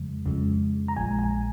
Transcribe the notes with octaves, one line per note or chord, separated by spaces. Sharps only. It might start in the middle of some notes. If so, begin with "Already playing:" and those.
Already playing: F2 C#3 F3 G#3
F2 C#3 F3 G#3
A#5
A#1 A#2 F3 G#3 G#5
G#5